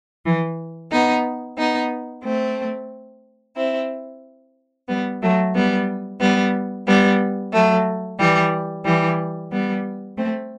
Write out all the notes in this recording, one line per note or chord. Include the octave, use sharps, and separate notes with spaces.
E3
B3 D#4
B3 D#4
A3 C4
C4 E4
G3 B3
F#3 A3
G3 B3
G3 B3
G3 B3
F#3 A3
E3 G3
E3 G3
G3 B3
A3 C4